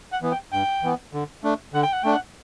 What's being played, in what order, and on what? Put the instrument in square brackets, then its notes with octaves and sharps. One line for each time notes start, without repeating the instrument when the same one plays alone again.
[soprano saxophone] F#5
[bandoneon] E3 B3
[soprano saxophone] G5
[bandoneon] G2 [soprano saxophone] G5
[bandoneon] E3 B3
D3
A3 D4
[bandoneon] D3 [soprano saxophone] F#5
[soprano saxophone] G5
F#5
[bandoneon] A3 D4 [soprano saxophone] G5
[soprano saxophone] F#5